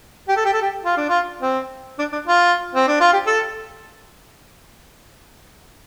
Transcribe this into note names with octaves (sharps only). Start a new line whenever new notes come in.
G4
A4
G4
A4
G4
F4
D4
F4
C4
D4
D4
F4
C4
D4
F4
G4
A4